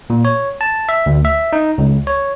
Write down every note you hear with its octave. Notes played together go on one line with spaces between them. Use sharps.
A#2
C#5
A5
E5
D2
E5
D#4
C#2
C#5